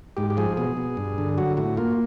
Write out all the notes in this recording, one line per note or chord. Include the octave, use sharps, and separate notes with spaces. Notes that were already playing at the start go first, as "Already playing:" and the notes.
G#2 G4
G4
F3 G#4
B2 G#4
B2
G2
D3
F#3 F#4
A2 F#4
A#3 F4